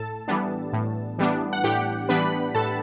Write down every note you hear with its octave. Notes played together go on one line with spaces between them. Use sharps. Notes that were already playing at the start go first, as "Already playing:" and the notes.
Already playing: A2 A4 A5
E3 G3 B3 D4
A2
E3 G3 B3 D4
F#5
A2 G4 G5
E3 G3 B3 D4 B4 B5
A2 A4 A5